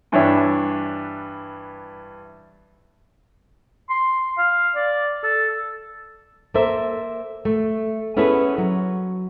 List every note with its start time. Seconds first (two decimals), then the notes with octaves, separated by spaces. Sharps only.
0.12 G2 E3 D4 C#5 E5 E6
3.89 C6
4.38 F5
4.75 D5
5.23 A4
6.54 A#3 A4 C5 E5
7.45 A3
8.17 B3 C#4 E4 G#4 A4 B4
8.58 F#3